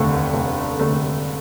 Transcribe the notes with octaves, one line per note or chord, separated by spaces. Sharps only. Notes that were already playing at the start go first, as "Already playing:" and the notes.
Already playing: F1 D#2 D3 A3
F1
D3 A3